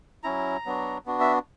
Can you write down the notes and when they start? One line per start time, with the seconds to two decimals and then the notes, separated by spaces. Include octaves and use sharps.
0.24 F#3 C#4 E4 A#5
0.66 F#3 B3 D4 F#4
1.06 B3 D4 F#4
1.20 E5